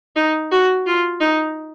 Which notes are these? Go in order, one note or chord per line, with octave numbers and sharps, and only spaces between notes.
D#4
F#4
F4
D#4